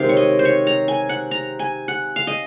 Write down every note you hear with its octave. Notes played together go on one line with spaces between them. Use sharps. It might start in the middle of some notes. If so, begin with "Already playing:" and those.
Already playing: C3 D#3 G#3 F5
C#5
D#5
C5
C#5
A#5
G#5
F#5
A#5
G#5
F#5
F5
D#5